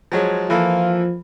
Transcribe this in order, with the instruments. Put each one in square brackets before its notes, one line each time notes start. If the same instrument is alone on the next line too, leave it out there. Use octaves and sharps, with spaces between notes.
[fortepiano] F3 F#3 G#3
[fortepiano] E3 A#3 A4 [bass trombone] F3 [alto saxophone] F4